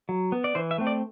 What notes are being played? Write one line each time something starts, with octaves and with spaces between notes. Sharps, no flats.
F#3
B3
D5
E3 C5
E5
A3 C4
D5